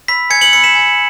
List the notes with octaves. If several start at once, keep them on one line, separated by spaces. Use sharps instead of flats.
B5 E6 B6
G#5 G#6 C#7
C#7 F#7
B5 E6 C#7 F#7
B6 E7
G#5